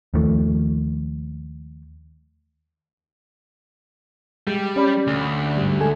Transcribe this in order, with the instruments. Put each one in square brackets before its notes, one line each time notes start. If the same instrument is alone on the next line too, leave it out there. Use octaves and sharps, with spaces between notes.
[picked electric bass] D#2 D#3 F3 A3
[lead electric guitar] G3 [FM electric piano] G#3
[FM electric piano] C#4 D5 B5
[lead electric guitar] D2
[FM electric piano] G#2 G3
G#3 A4 G#5